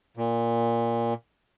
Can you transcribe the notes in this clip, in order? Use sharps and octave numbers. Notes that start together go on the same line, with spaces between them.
A#2